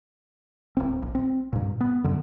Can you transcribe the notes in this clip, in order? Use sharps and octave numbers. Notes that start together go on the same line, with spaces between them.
D1 G#1 C4
A#1
C4
G2 A#2
B3
F#2 D3